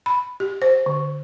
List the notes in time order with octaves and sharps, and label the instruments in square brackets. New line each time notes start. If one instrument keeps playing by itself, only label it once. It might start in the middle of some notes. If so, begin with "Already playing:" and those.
[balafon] B5
G4
C5
D3